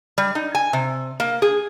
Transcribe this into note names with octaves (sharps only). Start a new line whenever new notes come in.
G3
D#4
G#5
C3
A#3
G#4